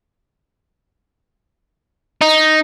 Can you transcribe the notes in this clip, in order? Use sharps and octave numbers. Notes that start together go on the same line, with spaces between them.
D#4